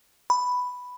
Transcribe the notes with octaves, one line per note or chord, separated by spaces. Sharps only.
B5